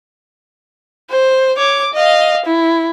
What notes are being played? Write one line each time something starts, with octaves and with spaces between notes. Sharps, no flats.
C5
C#5 D6
D#5 F5
E4